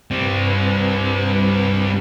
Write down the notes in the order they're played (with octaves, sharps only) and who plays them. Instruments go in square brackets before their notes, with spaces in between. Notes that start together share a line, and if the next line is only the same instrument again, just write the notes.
[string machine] G2 B4 [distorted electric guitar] G3 C4